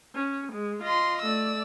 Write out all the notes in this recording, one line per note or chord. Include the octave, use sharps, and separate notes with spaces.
C#4
G#3
F4 D#5 C6
A3 D5 E6